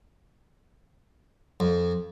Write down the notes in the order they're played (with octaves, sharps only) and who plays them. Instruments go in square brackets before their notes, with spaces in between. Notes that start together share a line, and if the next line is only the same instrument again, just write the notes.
[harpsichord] F2